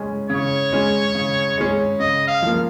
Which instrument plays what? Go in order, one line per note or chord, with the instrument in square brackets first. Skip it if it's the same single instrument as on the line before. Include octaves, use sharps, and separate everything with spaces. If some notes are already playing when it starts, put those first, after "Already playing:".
Already playing: [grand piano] C#3 G#3 C#4
[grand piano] C#3 [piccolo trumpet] C#5
[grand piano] G#3 C#4
C#3
G#3 C#4
[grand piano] C#3 [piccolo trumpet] D#5
[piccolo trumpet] F5
[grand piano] F3 A#3